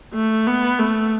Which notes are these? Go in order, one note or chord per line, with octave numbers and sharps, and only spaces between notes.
A3
B3
A3